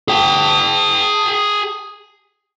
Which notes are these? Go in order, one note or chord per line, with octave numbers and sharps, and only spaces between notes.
G#4 G5